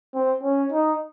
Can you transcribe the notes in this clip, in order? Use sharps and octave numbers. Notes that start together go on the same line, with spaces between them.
C4
C#4
D#4